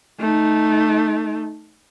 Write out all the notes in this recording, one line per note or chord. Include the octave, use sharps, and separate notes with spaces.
A3 D#4